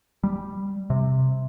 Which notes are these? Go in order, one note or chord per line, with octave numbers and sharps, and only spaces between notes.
G3
C3